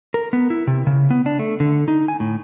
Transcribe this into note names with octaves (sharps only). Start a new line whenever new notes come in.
A#4
B3
E4
C3
C#3
B3
D4
A3
D3
D#4
G#5
A2